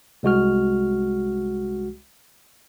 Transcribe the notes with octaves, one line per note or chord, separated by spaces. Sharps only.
C2 G#3 F#4 F6